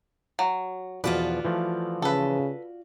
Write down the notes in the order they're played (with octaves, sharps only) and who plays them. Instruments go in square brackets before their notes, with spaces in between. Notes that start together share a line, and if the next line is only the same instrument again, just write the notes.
[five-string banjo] F#3
[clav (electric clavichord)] E2 B2 F3 [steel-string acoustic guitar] F4 F#4 D5 [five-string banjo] B4
[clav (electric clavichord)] E3 F3 A3
[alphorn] C#3 [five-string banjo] A4 B4